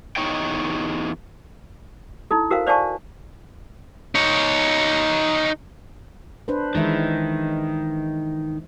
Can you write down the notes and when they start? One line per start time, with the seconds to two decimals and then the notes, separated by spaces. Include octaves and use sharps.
0.16 E2 A3 D#4 C#5 D#5 G5
2.31 D#4 E4 A4
2.51 F#4 A#4 C5 F5
2.67 C5 D5 F5 G#5 A5 C#6
4.15 D#4 C#5
6.48 D4 B4 C5
6.75 D#3 E3 G#3 E5